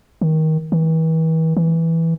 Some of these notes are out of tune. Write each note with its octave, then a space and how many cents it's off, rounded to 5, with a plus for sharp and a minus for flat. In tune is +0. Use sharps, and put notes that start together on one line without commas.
D#3 +20
E3 -40
E3 -5